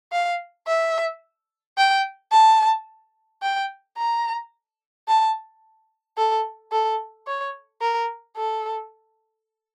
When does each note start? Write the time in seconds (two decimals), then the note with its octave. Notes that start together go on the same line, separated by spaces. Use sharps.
0.12 F5
0.67 E5
1.78 G5
2.32 A5
3.43 G5
3.98 A#5
5.08 A5
6.18 A4
6.72 A4
7.27 C#5
7.82 A#4
8.37 A4